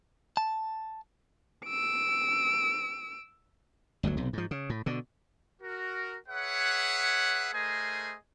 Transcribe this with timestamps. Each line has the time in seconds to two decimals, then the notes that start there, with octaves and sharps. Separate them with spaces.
0.37 A5
1.65 E6 D7
4.03 G1 D2 D3 F#3
4.17 B1 C3
4.33 G#2 F3
4.51 C#3
4.70 A2
4.86 B2 D3
5.62 F#4 A#4
6.28 G#4 B4 C#5 E5 F#5
7.54 A3 G#4 A#4 C5 D#5 G#5